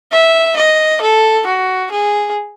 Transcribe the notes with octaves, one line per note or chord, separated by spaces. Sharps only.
E5
D#5
A4
F#4
G#4